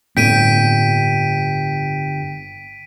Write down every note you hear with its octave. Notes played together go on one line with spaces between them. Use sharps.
G1 A2 A#3 C4 G5 B6 D7 D#7